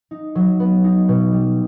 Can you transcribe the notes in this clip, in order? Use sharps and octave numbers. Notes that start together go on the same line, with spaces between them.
D#4
F#3
B3
D#4
B2
G3